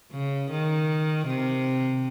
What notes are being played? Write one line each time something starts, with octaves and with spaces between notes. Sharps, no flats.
C#3
D#3
C3